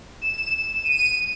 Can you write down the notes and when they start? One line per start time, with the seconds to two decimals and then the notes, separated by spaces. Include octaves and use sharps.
0.22 E7
0.85 D#7